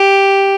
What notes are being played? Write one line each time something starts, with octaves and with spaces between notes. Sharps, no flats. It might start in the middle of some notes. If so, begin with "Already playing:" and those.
Already playing: G4